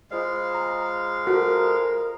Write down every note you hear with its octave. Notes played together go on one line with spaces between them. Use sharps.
G#3 F4 C5 D#5 F5
A#5
F4 F#4 A4 A#4 C5